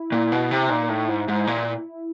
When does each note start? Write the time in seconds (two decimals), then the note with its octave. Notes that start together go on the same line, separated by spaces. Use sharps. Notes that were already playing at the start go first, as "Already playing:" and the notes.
Already playing: E4
0.12 A#2
0.32 B2
0.51 C3
0.70 A#2 D#4
0.89 A2
1.08 G#2 E4
1.28 G#2
1.47 A#2